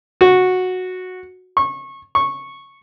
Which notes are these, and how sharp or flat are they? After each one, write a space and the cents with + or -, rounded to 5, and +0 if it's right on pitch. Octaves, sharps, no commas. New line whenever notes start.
F#4 -10
C#6 -25
C#6 -10